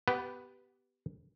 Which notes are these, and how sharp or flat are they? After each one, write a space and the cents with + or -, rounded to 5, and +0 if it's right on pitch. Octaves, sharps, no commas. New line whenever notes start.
B3 +10 G4 -10 B4 +0